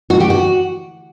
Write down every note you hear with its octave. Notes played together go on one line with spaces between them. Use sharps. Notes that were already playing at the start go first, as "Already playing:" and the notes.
F#4
G4
F#4